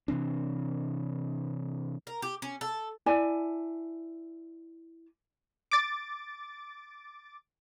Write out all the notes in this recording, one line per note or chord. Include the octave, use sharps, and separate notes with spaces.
C3 E3 C4 D4
A#4
G4
C#4
A4
E4 D5 G#5 A5
D6 A6